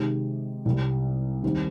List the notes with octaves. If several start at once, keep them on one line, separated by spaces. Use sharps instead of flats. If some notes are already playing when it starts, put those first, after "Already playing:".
Already playing: C3 D#3 G#3 D#4 G4
C2 C3 G3
D#2 D#3 G3 C4 D#4